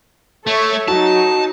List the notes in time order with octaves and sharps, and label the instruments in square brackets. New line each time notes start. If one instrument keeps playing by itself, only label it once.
[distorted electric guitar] A3 [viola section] A4 C#5 E5
[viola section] F#3 D#4 [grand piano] F#4 [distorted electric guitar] A5